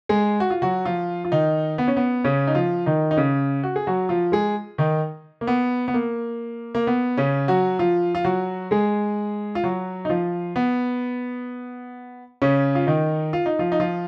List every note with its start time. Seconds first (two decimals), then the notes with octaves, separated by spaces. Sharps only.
0.09 G#3 G#4
0.40 F#4
0.50 F4
0.62 F#3 F#4
0.85 F3 F4
1.25 F4
1.32 D#3 D#4
1.78 B3
1.88 C#4
1.97 B3
2.24 C#3 C#4
2.47 D#4
2.55 F3 F4
2.86 D#3 D#4
3.11 D#4
3.17 C#3 C#4
3.64 F#4
3.76 G#4
3.87 F#3 F#4
4.09 F3 F4
4.32 G#3 G#4
4.78 D#3 D#4
5.41 A#3
5.47 B3
5.88 B3
5.94 A#3
6.75 A#3
6.87 B3
7.17 C#3 C#4
7.48 F#3 F#4
7.79 F3 F4
8.15 F4
8.25 F#3 F#4
8.71 G#3 G#4
9.55 F4
9.64 F#3 F#4
10.05 D#4
10.09 F3 F4
10.56 B3
12.42 C#3 C#4
12.75 F4
12.87 D#3 D#4
13.33 F4
13.46 D#4
13.59 F3 F4
13.72 D#4
13.80 F3 F4